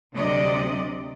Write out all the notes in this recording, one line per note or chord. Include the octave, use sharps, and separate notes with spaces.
D2 C3 F#3 D5 D#5